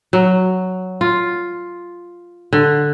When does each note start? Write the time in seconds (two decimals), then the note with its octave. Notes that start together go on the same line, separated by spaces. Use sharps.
0.13 F#3
1.01 F4
2.53 D3